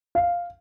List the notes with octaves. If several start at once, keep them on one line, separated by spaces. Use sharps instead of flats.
F5